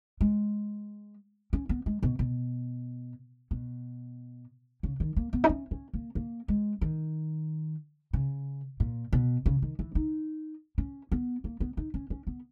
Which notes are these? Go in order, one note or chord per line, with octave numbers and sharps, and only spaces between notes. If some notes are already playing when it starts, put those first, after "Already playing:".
G#3
C#4
B3
G#3
B2
B2
B2
C#3
D#3
A#3
B3
D#4
C#4
C#4
A#3
A#3
G#3
D#3
C#3
A#2
B2
C#3
D#3
E3
D#4
C#4
B3
A#3
B3
D#4
C#4
C#4
B3